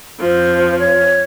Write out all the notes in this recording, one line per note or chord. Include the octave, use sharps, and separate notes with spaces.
F2 F3 C5
C#5